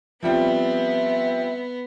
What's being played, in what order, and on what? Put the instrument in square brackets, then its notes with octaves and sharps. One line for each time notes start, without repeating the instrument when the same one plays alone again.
[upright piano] F3 G3 C4 [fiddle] B3 [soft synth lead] E5